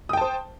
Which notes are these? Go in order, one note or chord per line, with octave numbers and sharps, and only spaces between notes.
C5 G5 A5 D#6